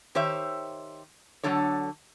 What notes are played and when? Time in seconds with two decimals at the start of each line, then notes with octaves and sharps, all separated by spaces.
0.15 D#3 G4 C5 C#5 E5
1.43 D3 F#3 D4 E4 A4 C#5